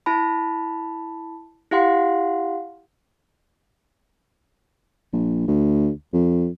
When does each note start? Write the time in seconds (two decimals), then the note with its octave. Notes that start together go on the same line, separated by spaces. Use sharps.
0.06 E4 A5 B5
1.71 E4 G4 F5 F#5 C6
5.13 A#1
5.48 D2
6.13 F2